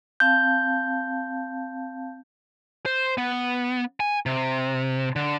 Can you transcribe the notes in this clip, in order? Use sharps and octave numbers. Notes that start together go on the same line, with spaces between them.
C4 F5 A5 G6
C5
B3
G#5
C3
D3